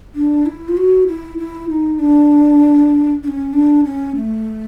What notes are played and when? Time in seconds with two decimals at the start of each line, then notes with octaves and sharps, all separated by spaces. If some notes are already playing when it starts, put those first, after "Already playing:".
0.15 D4
0.46 E4
0.69 F4
0.77 F#4
1.07 E4
1.38 E4
1.70 D#4
1.99 D4
3.23 D4
3.28 C#4
3.53 D4
3.84 C#4
4.16 A3